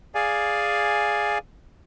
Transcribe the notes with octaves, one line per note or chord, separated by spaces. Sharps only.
G#4 D5 F5 G#5